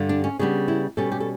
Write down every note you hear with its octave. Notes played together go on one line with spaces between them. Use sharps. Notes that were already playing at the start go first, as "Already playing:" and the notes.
Already playing: G2 D3 G3
D4
C#4
C#3 G3 B3 D4
E4
B2 G3 C#4 A4
G4
A4